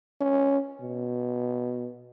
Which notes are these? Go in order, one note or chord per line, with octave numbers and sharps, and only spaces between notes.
C#4
B2